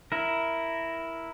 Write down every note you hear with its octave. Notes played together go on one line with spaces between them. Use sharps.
E4 A#4